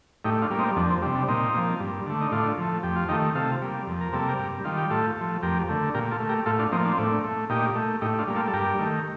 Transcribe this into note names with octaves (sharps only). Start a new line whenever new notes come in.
A2 D#4 G4
D4 F4
G3 A#3
C4 D#4
F2 D4
C4
C3 G3 D4
D4
A#2 C4 D#4
F3 A#3
G2
D3 A3
D#4
A2 D4 F4
F3 A3
F2 G4
F4
D#3 A3 D#4 G4
C3 F4 A4
G3 A#3
F2
A#4
C3 G3 A#3 A4
G4 A#4
G2
D#3 G3 F4
G4
A2 F4 A4
F3 A3
F2 G4 A#4
D3 A3
A#2 G4 A#4
F4 A4
A3
G4 A#4
A2 F4 A4
D4 F4
F3 A#3 C4 D#4
D4
C4
A2 D4
A3
A#2 D#4 G4
A3
A2 D#4 G4
D4 F4
G3 A#3
F4 A4
A4
G2 G4 A#4
D#3 A3